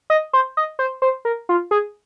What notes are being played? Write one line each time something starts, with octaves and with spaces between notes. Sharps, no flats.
D#5
C5
D#5
C5
C5
A#4
F4
G#4